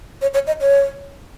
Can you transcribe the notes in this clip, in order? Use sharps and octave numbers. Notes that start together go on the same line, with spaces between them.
C#5
C#5
D#5
C#5